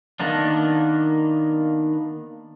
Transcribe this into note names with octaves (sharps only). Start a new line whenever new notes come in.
D#3 A#3 B3 D4